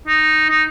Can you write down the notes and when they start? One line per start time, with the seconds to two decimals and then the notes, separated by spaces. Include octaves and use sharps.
0.08 D#4
0.50 D#4